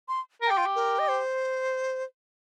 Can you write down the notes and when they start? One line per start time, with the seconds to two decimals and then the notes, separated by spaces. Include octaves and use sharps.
0.08 C6
0.41 A#4 A#5
0.47 G4 G5
0.58 F4
0.66 G4
0.76 A#4
0.99 D#5
1.09 C5